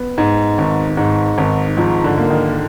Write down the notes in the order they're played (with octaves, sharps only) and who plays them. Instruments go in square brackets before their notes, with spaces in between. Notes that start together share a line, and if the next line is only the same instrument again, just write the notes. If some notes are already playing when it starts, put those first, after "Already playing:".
Already playing: [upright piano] B3
[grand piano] G#2
G#1
G#2
G#1
[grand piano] G#2 [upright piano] F3
[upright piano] D3
[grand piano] A#3
[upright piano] D#3